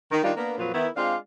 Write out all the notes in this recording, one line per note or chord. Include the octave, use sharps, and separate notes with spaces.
D#3
D#3 G3 D4 D#4 F4
A#3 B3 D4
F2 A#2 F3 F#3 F4 B4
D#3 B3 E4
G#3 C4 D4 F4 D5 F5